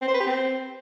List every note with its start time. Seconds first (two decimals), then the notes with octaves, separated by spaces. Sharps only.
0.02 C4
0.08 C5
0.14 B4
0.20 G4
0.26 C4